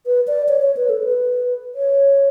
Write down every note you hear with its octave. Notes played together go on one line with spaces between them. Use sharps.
B4
D5
C#5
C#5
B4
A4
B4
C#5